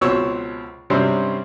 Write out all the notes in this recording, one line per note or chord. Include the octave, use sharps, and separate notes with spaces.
C#2 B2 F#3 C4 C#5 E6
G2 C3 F#3 C4 C#4